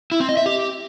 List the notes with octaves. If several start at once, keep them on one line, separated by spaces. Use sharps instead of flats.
E4
C4
D#5
E5
G4